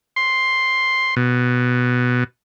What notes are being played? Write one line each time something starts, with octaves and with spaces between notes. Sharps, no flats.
C6
B2